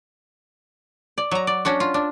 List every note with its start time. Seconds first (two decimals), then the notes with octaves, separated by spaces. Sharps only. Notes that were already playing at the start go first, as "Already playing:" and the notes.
1.18 D5
1.31 F#3 A#5
1.47 D5
1.65 C#4 D4 F#4
1.80 F4
1.94 D4